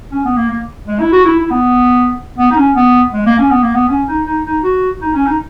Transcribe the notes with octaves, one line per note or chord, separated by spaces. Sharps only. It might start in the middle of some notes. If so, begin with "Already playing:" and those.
C#4
B3
A#3
A#3
G#3
E4
F#4
E4
E4
B3
B3
D#4
C#4
B3
G#3
A#3
C#4
B3
A#3
B3
C#4
D#4
D#4
D#4
F#4
D#4
C#4
D#4